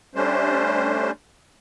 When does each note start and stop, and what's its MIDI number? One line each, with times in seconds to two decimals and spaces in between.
0.15 1.11 55
0.15 1.11 57
0.15 1.11 61
0.15 1.11 62
0.15 1.11 72